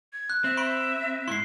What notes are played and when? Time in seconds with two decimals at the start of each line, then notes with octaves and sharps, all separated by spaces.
0.13 G#6
0.30 F#6
0.44 C4 E5
0.57 B5 C6 D7
1.28 G#2 E4 C6 C7